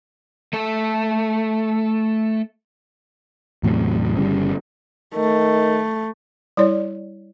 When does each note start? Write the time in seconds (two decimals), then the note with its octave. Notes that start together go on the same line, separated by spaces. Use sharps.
0.53 A3 A4
3.63 E2 A2 C3 F#3
4.17 G1 C#3 G3
5.15 D#3 A3
6.57 G3 E4 C#5 D5